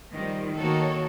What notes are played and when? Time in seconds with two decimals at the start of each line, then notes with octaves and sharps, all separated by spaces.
0.13 D#3 F3 G3
0.57 D#3 A#3 F#4 A4 C#5